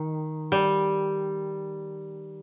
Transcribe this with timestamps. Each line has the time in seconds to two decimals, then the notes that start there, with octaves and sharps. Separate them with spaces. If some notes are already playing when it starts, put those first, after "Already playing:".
Already playing: D#3
0.52 G3